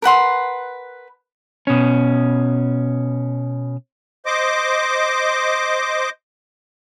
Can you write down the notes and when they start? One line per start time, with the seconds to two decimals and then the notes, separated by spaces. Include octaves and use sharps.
0.02 A#4 B4 F#5 C6
1.67 B2 C#4
4.26 C5 D#5 D6